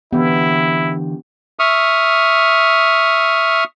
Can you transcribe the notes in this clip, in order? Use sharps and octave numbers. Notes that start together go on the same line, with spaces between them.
D3 E3 B3 E4 G4
E5 C#6 D#6 F6